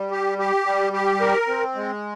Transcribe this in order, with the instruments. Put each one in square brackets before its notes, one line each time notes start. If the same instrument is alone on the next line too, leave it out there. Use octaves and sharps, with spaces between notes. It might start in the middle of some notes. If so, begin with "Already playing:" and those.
Already playing: [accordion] G3
G4
G4
G3
G4
A#4
C4
G#3